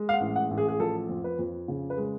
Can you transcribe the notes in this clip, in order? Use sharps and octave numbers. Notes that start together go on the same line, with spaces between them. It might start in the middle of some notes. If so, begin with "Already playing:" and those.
Already playing: G#3
F5
F#5
A1
F#5
A1
G#4
G#4
F3 A4
F2
B4
F2
C#3
B4
G#3